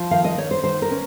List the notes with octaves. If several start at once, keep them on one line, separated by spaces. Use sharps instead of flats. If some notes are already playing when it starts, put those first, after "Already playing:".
Already playing: F3
D#3 F5
D#5
D#3 C#5
C5
D#3 C5
A#4
C#4